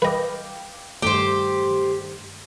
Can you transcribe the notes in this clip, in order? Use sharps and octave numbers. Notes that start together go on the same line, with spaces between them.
B4 D#5 F5 G5 D6
G2 D#3 A3 G4 C5